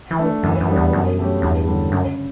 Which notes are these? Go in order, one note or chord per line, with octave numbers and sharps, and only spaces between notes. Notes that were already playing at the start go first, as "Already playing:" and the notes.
E3
A3 D4
F#2 E3
F#2
G3 B3 D4
E2
F#2 B2
F#3 A3 C#4 G4
E2 G2
D3 G3 C#4
F#2 C#3